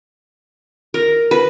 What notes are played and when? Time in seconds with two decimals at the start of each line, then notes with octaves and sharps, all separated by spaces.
0.94 A#4
1.31 B4